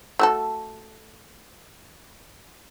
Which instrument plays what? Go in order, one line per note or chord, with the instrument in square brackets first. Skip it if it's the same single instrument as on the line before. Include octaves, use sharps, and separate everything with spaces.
[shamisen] A3 F#4 A4